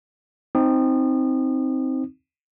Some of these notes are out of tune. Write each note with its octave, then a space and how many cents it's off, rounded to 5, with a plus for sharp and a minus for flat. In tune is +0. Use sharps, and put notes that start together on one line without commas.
C4 +0 D#4 +10 D#6 -35